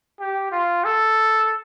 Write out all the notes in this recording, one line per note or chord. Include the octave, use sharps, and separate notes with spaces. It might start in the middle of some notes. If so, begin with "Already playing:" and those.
G4
F4
A4